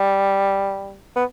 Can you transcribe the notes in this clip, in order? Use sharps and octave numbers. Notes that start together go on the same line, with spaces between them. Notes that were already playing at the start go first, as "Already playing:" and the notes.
Already playing: G3
B3